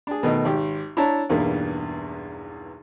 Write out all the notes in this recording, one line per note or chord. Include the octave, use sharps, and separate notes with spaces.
D4 G#4
B2 D#3 A3 D#4
G#1 G4
D4 E4 C#5 A5 A#5
B1 E2 G2 A#3